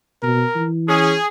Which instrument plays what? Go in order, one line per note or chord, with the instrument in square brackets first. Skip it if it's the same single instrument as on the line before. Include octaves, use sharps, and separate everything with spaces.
[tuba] B2 [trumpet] A#4
[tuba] E3
[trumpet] C#4 [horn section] G#4